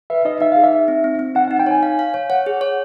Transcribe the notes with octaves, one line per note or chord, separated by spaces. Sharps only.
B4 E5
D#4 D#5
D#4 E5
G#4 F5
E5
D#4
C4
C4
C4
D#4 F#5
D#4 F#5
G5
C#5 G#5
F5
F5
C#5
C#5 F#5
G#4
C#5